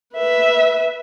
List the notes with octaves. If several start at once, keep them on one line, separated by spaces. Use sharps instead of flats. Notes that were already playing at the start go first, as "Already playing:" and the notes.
B4 E5